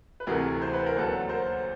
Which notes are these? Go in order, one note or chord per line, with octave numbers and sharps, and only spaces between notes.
B4
D2 C3 E3 A3 G#4 A#4
C5
B4
A#4
D#2 D3 F#3 A4 B4
A#4 C5